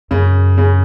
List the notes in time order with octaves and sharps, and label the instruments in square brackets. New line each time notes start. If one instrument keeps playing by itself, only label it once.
[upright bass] F#2 [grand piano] C#3
[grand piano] C#3